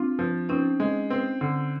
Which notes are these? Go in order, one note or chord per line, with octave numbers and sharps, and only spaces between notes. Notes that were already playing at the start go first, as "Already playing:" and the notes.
Already playing: C4 D4 F4
F3
C4 C#4 D#4
G#3
C4
D3